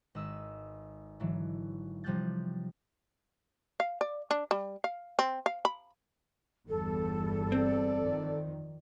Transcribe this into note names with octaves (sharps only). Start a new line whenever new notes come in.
G#1 B4 D#5 E6
G#2 D3 E3 F#3
C3 F3 G3 F#6 G6 A6
F5
D5
D4
G3
F5
C4
F5
B5
G1 E2 G3 A4
C4 D5
F2 D#3